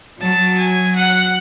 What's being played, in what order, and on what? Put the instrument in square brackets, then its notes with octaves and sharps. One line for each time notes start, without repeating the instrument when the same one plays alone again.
[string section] F#3 [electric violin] A5
[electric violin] G#5
F#5